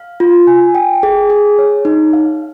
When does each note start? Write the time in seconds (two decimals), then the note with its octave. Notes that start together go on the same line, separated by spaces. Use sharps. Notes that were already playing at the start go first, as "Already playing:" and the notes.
Already playing: F5
0.20 F4
0.47 G#5
0.75 G5
1.03 G#4
1.30 G#4
1.59 C#5
1.85 D#4
2.13 F5